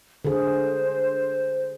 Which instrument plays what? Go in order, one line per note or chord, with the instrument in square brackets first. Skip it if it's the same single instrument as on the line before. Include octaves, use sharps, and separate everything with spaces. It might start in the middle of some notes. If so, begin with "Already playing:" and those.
[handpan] D3 G#4 [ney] C5